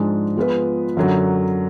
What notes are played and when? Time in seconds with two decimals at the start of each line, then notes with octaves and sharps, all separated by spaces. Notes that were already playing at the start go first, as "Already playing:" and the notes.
Already playing: G#2 F3 G#3 D4
0.36 F3 G#3 B3 F4 B4
0.97 F#2 D3 F#3